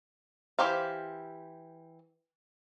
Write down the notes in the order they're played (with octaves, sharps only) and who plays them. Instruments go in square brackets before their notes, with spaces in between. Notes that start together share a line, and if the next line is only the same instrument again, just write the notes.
[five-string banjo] E3 G4 C5 F5